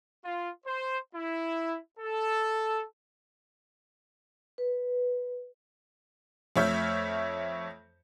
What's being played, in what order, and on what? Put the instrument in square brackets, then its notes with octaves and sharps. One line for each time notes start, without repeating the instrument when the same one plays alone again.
[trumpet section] F4
C5
E4
A4
[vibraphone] B4
[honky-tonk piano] F2 A3 C#5 E5 F6 G6